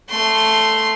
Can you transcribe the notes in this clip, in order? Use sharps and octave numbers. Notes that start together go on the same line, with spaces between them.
A3 C6